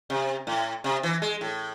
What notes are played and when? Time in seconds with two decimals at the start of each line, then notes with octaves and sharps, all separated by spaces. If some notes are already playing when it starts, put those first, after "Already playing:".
0.10 C3
0.47 A2
0.84 C3
1.03 E3
1.22 G#3
1.41 A2